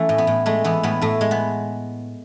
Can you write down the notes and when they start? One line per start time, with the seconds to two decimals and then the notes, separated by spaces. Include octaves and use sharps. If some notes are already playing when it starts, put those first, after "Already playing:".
Already playing: E3 A3 C#4
0.09 A2
0.18 B3
0.27 A2
0.46 G#3 A3
0.64 E3 B3
0.83 A2 B3
1.01 A2 A3
1.21 G#3
1.31 B3